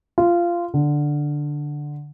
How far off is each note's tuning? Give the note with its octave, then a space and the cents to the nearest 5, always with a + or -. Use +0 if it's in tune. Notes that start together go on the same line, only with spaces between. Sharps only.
F4 -15
D3 +5